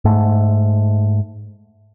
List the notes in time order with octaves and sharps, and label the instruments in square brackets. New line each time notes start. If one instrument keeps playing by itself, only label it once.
[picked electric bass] G#2 A3